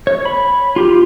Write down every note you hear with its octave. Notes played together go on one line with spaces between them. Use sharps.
C#5
B5
F4 G4